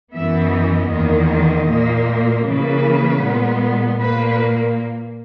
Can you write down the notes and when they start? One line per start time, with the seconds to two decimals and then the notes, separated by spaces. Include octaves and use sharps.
0.15 F#2 E3 B3 E5
0.53 D#5
0.91 E2 D#3 A#3
1.69 A#2 A#3
2.45 C#3 E3 A#3 B4
3.22 A#2 G#3 B3
3.99 A#2 A#3 B4